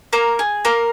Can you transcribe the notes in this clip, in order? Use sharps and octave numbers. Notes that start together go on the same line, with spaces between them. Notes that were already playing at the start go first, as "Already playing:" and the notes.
A#3 A#4
G#4
A#3 A#4